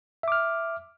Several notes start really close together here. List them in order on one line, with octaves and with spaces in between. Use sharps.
E5 D6 F6